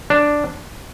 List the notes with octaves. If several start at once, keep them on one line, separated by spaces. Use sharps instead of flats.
D4